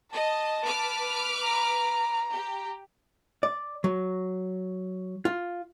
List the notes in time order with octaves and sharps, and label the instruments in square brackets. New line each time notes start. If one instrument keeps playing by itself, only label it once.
[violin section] D#5 [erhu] A5
[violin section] B4 D6 F6
[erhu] A#5
[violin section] G4
[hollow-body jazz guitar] D5
F#3
F4